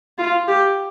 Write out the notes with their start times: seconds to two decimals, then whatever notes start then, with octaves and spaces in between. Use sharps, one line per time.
0.18 F4
0.48 G4